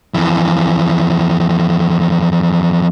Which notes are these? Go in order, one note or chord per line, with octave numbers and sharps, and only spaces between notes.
F2 E3